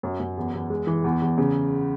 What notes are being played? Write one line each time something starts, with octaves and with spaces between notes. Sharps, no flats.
F#2
F#2
E2
E2
G#3
E3
E2
E2
C#3